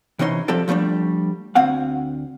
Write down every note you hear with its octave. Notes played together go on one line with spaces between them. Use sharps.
C3 E3 C#4 D#4 C6
F3 C4 G4 A4 D5
F3 G3 A3 C4 D4
D2 C4 F5 F#5